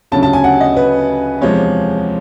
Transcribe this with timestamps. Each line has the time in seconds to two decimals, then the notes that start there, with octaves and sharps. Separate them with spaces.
0.12 D2 C#3 F#3 A5
0.23 A5
0.33 G#5
0.44 F#5
0.61 D#5
0.77 B4
1.41 E2 C3 F3 G#3 C#5